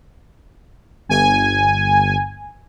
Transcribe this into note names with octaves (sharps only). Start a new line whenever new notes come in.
G1 G#5